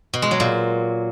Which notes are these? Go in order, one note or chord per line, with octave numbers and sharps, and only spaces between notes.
B2
G#3
F#3
A#2